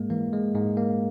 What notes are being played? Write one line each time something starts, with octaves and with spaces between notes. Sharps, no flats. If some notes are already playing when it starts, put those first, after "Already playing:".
Already playing: G#2 G#3 A#3
E3 A#3
G#3
G#2 G#3
A#3